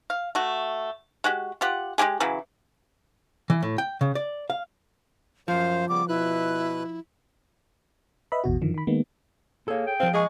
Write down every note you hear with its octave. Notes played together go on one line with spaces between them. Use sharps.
F5
A3 F#4
G#3 F#4 G4
F4 G4 F#5
G#3 E4 G4 G#4
C#3 E3 F#3
E3
A2
G5
C#3
D5
F5
F#2 F3 C5 F5
C#3 G3 B3 D6
B2 E4 B4 F#6
B4 D#5 E5 B5
A1 E2 B2 F#4
F#2 D3 D#3 F3
D#3 B5
D#3 G#3 A#3 B3
A#3 G#4 A4 C#5
G5
F3 C4 F5
G#3 G#4 D#5 G#5 C#6